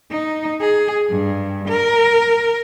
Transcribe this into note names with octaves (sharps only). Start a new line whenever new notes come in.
D#4
G#4
G2
A#4